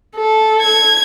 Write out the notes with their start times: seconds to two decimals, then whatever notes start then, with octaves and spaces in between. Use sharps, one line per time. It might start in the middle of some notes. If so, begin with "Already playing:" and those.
0.16 A4
0.61 G#6